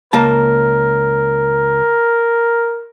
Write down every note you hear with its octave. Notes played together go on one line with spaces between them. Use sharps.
C#2 A#3 A#4 A5